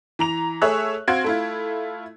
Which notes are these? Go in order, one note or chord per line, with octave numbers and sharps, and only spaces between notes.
E3 A#5 F7
A3 G#4 C#5 E5 F#6
C4 F#4 F5 C6 G#6 D7
A3 E4 F4